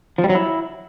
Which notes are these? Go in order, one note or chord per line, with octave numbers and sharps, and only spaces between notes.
F3
G3
F#3
E4